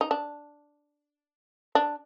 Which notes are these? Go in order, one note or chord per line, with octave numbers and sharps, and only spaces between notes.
D#4
D4
D4